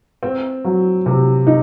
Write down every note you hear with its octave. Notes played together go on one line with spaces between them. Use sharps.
C4
F#3
C3
D#4